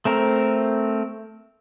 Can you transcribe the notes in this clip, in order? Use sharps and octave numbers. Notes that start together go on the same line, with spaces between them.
A3 C4 A#4